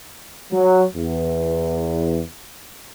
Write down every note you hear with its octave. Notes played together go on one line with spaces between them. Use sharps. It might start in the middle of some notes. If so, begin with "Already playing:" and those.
F#3
E2